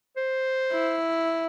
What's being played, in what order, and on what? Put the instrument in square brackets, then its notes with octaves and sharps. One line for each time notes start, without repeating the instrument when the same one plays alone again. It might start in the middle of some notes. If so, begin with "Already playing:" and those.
[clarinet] C5
[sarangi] E4